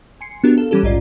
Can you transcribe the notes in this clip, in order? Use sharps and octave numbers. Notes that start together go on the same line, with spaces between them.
G#5 C6 C7 C#7
B3 D4 F#4 G4 A#4
A4 F5
E3 G3 C#4 G4 A4
A#1 D#2 G#2 C#4 F4 D5